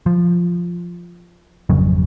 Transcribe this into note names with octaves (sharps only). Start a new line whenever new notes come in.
F3
G#1 F2 C#3 F#3